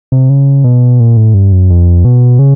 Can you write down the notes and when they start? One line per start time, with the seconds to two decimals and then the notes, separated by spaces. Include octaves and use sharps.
0.12 C3
0.29 C#3
0.64 B2
1.00 A#2
1.17 A2
1.34 G2
1.52 F#2
1.70 F2
2.05 B2
2.39 C#3